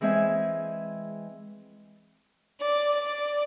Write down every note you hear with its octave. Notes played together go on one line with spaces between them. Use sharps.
E3 G#3 C4 E5 G#5
D5
D5